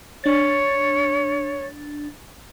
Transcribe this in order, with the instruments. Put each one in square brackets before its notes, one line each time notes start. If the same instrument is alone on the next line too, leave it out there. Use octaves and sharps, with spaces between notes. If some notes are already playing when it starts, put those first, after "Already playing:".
[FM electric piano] D4 A6 [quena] C#5